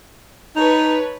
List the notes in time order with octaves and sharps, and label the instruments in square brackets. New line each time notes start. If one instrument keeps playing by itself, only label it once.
[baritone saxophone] D#4 [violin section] B4 C#5 A5